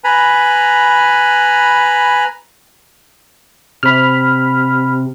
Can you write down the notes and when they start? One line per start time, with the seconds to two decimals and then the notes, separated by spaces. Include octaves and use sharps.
0.04 B4 G#5 A#5 B5
3.83 C3 B5 F6